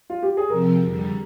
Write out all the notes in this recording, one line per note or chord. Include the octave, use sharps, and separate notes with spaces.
F4
G4
G#4
C3 F3 C4 A#4
F2 D3 G3